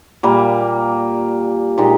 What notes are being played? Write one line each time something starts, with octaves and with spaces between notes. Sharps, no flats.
A#2 G3 A#3
A#2 G#3 D#4 G4